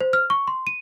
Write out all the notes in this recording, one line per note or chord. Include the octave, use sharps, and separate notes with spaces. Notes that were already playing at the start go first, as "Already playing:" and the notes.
C5
F6
C#6
C6
D#7